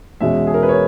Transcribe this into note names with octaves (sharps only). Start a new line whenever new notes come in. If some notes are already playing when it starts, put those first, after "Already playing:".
E2 B2 G#3 C#4 E5
G#4
A#4
B4
C#5